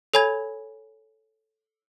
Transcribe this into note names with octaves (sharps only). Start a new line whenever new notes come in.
A4 C#5 G#5 B5 G#6